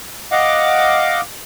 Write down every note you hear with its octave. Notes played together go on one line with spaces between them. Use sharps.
D#5 F5 F#5 D6